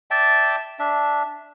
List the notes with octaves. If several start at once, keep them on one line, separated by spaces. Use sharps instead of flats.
D5 E5 G5 A5
D4 E5